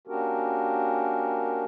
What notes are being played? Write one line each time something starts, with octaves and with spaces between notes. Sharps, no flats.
A#3 C#4 D4 F#4 G4 A#4